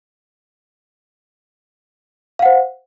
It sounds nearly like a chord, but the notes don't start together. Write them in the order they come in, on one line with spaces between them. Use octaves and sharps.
F5 F#5 C5